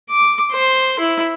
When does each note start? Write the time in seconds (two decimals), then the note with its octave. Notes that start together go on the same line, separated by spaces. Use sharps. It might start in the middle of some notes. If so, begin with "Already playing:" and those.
0.10 D6
0.52 C5
1.00 E4